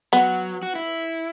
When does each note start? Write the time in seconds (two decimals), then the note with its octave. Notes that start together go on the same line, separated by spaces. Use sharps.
0.13 F#3 B3
0.63 F#4
0.75 E4